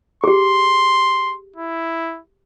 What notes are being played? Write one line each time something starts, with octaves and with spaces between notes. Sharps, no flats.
G4 G#4 C6
E4